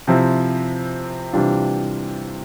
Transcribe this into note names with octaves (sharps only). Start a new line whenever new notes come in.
C3 F3 C4 E4
C3 E3 G3 D4 F4